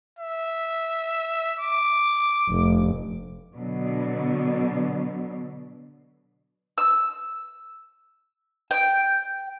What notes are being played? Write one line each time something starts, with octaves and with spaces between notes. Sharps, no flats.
E5
D6
F1
B2 D3 F#3
E6
G5